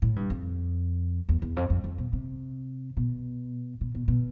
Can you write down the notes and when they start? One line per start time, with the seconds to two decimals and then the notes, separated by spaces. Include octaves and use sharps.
0.02 A2
0.16 G2
0.30 F2
1.29 E2
1.42 E2
1.56 F2
1.70 F2
1.84 F2
1.98 B2
2.13 C3
2.97 B2
3.81 B2
3.95 B2
4.08 B2